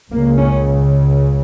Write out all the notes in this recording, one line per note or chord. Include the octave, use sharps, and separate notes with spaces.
C#2 C#3 A#3
C#4